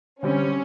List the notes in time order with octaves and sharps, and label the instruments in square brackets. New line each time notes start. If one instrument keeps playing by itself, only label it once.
[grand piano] D3 G3 C4 [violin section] C#4